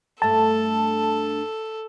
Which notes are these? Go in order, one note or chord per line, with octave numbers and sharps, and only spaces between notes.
G2 A3 A4 A5